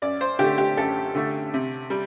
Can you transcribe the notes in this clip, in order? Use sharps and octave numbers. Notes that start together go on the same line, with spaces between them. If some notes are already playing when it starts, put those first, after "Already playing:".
F#2 D5
C5
D3 A3 G4
G4
F#2 A4
D3 A3
C3
G3